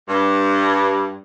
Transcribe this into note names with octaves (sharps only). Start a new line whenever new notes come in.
G2